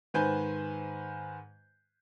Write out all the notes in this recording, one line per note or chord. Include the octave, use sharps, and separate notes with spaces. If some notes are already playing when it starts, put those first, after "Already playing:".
G#2 D#3 B4 C5 G#5 G6